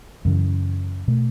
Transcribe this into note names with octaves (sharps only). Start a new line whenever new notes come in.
F#2 C#3 E3
B2 A3